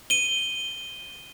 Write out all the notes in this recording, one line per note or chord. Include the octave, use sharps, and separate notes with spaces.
D#7 G7